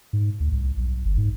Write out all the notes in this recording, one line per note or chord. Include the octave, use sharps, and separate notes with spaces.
G#2
D2
C2
B1
G1
G#2